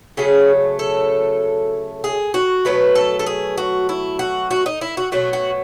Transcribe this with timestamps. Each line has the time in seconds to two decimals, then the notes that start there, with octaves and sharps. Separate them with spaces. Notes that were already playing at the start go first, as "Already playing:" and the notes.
0.17 C#3 F#3 A3 G#4
0.79 A4
2.04 G#4
2.34 F#4
2.65 B2 F#3 A3 B4
2.95 A4
3.19 A4
3.26 G#4
3.58 F#4
3.89 E4
4.19 F#4
4.51 F#4
4.66 D#4
4.81 E4
4.97 F#4
5.12 B2 F#3 A3 F#4
5.33 F#4